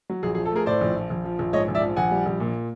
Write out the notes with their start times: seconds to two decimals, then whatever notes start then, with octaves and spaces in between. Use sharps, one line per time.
0.10 F#3
0.23 A#1 G#4
0.35 G#4
0.38 F3
0.46 A4
0.52 A3 G#4 A#4
0.66 A2 C5 D5
0.81 A#1
0.95 F3
1.10 A#1
1.24 F3
1.39 A#1
1.53 G#2 C#5 D#5
1.68 A#1
1.75 D5 E5
1.82 F3
1.96 A#1 F#5 G#5
2.11 G3
2.26 A#1
2.40 A#2